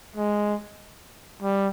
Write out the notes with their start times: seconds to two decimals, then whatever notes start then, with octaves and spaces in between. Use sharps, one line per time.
0.16 G#3
1.43 G3